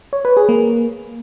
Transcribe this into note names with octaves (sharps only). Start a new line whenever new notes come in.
C#5
B4
G#4
A#3